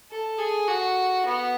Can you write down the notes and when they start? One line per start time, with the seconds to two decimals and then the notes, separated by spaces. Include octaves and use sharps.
0.11 A4
0.38 G#4
0.68 F#4
1.26 B3